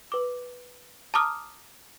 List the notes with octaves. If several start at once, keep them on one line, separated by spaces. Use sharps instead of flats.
B4 D6
A5 A#5 D6 D#6 F6